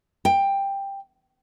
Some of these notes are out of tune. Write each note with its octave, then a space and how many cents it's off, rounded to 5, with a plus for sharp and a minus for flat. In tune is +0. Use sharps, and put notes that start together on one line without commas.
G5 +10